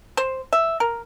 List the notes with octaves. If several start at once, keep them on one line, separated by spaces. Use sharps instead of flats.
C5
E5
A#4